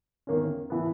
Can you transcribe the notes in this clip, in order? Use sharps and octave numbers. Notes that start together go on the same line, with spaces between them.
E2 D#3 A#3 C#4
E3 B3